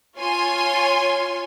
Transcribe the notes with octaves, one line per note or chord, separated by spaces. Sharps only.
F4 C#5 G#5 C6